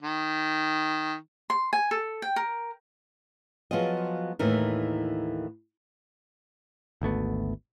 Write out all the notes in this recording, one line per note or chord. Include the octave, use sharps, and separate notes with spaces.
D#3
C6
G#5
A4
G5
A#4
F3 F#3 B3 F4 G#4 D#5
D#2 A2 E3 D#4 A#4
G#1 D2 A3 B3